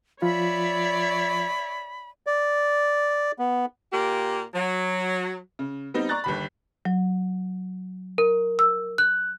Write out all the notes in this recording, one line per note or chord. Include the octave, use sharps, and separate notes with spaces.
F3 F4 C#5 D5 E5 B5
D5
B3
A#2 A#3 G4
F#3
C#3
G3 B3 C4 D#4
D5 A#5 C#6 F#6 A6
G1 D#2 B5
F#3
A#4
E6
F#6